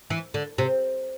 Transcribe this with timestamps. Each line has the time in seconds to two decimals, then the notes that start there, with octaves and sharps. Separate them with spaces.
0.10 E3
0.34 D3
0.58 C3